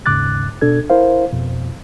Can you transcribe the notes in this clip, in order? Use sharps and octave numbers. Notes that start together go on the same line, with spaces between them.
D#2 G#2 C#3 D6 F#6 A6
B2 D4 A4 G#6
E4 A#4 C5 F5
F2 B2